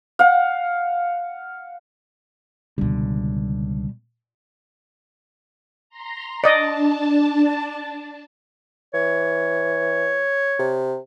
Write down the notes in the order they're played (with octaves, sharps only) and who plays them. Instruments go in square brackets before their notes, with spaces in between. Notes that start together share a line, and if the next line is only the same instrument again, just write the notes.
[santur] F5 F#5
[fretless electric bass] C#2 D3 [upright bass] B2 G3
[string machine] A#5 C6
[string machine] D4 A5 [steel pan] D5 D#5
[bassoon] E3 [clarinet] C#5
[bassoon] C3